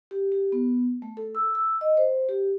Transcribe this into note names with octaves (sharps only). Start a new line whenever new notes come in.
G4
G4
B3
A3
A4
E6
E6
D#5
C5
G4